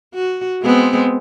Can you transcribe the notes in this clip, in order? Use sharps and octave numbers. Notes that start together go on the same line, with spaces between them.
F#4
G#3 B3 C4